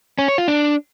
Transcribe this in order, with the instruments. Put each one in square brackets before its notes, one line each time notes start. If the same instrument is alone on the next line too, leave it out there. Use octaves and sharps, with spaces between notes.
[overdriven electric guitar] C#4
C#5
F4
D4